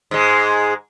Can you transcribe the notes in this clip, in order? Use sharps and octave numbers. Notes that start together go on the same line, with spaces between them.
G#2 G#3